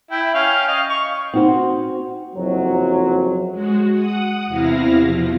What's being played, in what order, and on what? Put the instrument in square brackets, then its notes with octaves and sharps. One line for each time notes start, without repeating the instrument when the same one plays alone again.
[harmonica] E4 G5
C#4 F5 G5
D#5 F5
C#6
[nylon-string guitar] C4 F#4 C5 [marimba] D#4
[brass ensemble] F#1 F2 C3 F#3
[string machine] G#3 F#4
F#5 D#6
E2 C3 E4 F5 A#6
B2 F3